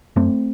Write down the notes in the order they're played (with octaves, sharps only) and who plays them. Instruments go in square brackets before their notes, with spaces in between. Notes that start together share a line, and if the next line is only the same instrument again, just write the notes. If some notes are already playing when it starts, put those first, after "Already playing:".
[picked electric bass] F#2 A3 C4